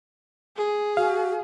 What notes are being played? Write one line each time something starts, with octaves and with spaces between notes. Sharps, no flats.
G#4
F#4 F5